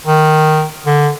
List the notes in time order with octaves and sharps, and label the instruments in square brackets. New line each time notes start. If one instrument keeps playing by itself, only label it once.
[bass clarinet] D#3
D3